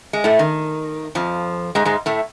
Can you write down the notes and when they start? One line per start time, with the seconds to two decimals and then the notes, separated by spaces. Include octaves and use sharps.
0.13 G#3
0.24 A2 A3
0.39 D#3
1.15 F2 F3
1.75 G#2 G#3
1.85 G#2 G#3
2.06 A2 A3